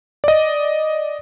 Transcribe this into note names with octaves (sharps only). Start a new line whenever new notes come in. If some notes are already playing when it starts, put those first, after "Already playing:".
D5 D#5